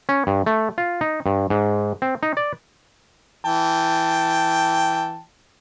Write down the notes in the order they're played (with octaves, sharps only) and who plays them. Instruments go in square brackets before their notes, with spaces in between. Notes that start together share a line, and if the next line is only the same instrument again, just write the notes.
[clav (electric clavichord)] C#4
G2
A3
F4
D#4
G2
G#2
C4
D#4
D5
[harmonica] E3 G5 A5